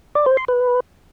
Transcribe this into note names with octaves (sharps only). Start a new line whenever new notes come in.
D5
C5
C6
B4